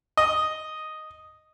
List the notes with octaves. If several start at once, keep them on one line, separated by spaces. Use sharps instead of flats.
D#5